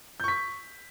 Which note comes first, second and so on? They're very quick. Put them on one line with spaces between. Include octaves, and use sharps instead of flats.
G6 C#6 B6